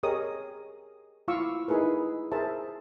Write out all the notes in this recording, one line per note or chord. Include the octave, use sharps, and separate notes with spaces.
G4 G#4 A#4 C#5 D#5 D#6
E4 F4 F5 C#6 D6 E6
D#4 E4 G#4 A#4 B4
G#4 A#4 C5 E5 A5